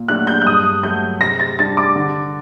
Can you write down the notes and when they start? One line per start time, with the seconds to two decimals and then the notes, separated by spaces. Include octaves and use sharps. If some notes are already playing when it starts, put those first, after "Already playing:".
Already playing: A#2
0.08 F#3 A3 D4 G4 F#6
0.27 G6
0.42 F#6
0.46 G2 D#6
0.83 F#3 A3 G6
1.21 C3 A#6
1.40 A6
1.59 G3 D4 G4 A6
1.77 D6
1.96 D3